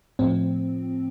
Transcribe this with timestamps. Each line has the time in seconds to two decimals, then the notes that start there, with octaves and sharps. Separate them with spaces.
0.19 A2 F3 C4